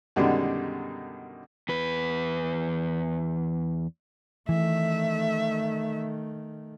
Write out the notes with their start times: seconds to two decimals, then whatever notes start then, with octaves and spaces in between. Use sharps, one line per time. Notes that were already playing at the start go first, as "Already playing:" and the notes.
0.16 F#2 B2 D3 D#3 G3 G#3
1.69 E2 B4
4.49 D#3 E3 A3 E5